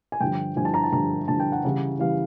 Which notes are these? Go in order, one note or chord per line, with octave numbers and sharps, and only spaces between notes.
G#5
G2 D3 F3 G5
G2 D3 F3 G#5
A5
A#5
A5
G2 D3 F3 A#5
G2 D3 F3 A5
G5
F#5
C#3 E3 G3
C#3 E3 G3 F5